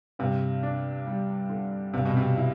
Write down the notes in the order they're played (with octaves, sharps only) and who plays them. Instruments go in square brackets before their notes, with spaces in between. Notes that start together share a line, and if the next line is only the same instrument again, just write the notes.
[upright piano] G2 [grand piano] C3
[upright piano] D4
G3
D3
[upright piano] G2 [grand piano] C3
[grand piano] B2
C3
[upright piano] E4